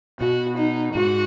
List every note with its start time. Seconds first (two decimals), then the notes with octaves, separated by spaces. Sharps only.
0.20 B2 F#4
0.57 D#4
0.94 G#2 F#4